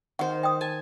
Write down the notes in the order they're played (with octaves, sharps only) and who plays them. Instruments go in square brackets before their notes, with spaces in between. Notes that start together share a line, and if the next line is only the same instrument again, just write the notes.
[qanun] D#3 C5 [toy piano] F#5
[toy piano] G5 D#6
[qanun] G#5 A5